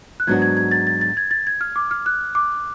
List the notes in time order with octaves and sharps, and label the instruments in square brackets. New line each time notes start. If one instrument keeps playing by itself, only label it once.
[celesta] F#6
[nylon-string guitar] G#2 F#3 B3 D4 F#4 [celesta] G#6
[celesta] G#6
G#6
A6
A6
A6
G#6
A6
G#6
F6
D6
F6
F#6
D6